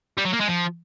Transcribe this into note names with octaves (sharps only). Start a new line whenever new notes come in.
G3
F#3
A#3
G#3
F3